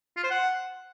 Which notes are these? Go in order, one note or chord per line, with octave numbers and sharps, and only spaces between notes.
F4
C5
F#5